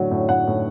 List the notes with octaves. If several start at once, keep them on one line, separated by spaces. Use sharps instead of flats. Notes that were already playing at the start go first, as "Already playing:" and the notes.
Already playing: A2 D3 F#3
A2
A2 F#5
A2